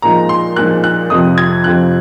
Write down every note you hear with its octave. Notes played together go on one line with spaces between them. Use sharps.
A#2 F3 G#3 D#4 A#5
C6
A#2 F3 G#3 D#4 F#6
F#6
F2 C3 F3 C4 D#6
G#6
F2 C3 F3 C4 F#6